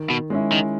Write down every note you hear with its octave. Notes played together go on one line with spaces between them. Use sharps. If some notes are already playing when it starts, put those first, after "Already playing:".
Already playing: D#3
B2
G#3 C#4 E4
D#3